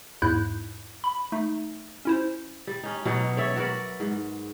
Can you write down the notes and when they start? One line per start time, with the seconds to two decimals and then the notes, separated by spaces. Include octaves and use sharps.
0.22 E2 G#2 E4 F#6 G6
1.04 B5
1.32 A3 D#4
2.05 C#4 E4 C5
2.67 G3
2.83 C#4 D#4
3.05 B2 F#3 G3 D#4
3.37 C#5 D5 E5
3.56 F#4 A#4 B4 D5
4.00 G#2